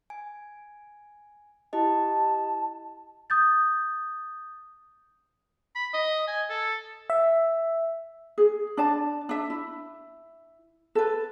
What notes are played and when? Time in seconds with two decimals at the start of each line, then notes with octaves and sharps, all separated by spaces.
0.10 G#5
1.73 E4 G4 D#5 A5
3.30 D#6 G6 A6
5.75 B5
5.94 D#5
6.28 G#5
6.50 A4
7.10 E5
8.38 G#4
8.77 D4 D5 A5
9.29 D4 E5
9.50 E4
10.95 A4 B4